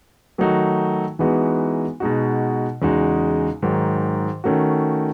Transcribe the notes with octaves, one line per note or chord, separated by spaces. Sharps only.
D#3 F#3 A3 D#4 F#4
E3 G#3 B3 D#4 F#4
B2 G#3 D#4 F#4
E2 C#3 G#3 D#4 F#4
G#2 D#3 F#3
D#3 A3 C#4 F#4